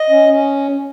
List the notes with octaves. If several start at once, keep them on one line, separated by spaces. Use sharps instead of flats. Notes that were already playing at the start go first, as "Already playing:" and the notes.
Already playing: D#5
C#4
C#4